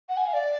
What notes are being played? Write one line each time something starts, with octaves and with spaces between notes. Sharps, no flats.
F#5
G#5
F5
D5